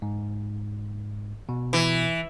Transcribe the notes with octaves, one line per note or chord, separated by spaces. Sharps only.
G#2
B2
E3